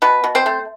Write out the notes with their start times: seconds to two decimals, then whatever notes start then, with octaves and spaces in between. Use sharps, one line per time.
0.02 B2 B3 B4
0.24 B2
0.35 C4 C5
0.46 A3